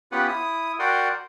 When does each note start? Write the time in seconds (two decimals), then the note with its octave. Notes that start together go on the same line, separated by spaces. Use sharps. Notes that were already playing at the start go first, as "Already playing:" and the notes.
0.12 B3 C#4 F4 G4 B4 F#5
0.28 E4 D#6
0.79 F#4 A#4 D5 F#5 G5 C6